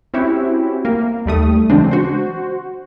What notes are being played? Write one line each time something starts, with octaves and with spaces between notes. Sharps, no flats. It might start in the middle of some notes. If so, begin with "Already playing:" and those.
C4 C#4 E4 F#4 G4
A#3
D#2 G3 A3 D#6
C#3 E3 F#3 G#3 C4 D4
F#4 C5